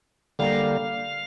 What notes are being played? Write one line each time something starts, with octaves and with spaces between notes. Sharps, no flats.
D3 G3 A#3 F5